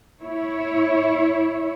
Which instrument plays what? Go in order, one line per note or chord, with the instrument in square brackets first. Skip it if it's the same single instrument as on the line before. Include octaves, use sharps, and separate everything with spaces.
[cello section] E4 C#5